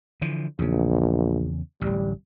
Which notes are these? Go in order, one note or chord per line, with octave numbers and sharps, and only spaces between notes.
D3 E3 F3
A#1 E2 C#3
D1 A1 G3